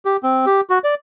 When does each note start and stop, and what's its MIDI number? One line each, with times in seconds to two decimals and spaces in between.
0.05 0.17 67
0.23 0.45 60
0.46 0.61 67
0.70 0.79 66
0.84 0.95 74